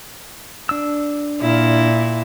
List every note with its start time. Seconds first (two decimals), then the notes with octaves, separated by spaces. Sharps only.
0.69 D4 E6
1.41 A#2 E4